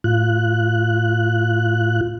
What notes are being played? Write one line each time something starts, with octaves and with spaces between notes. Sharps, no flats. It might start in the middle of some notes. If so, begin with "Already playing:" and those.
A2 F4 F#6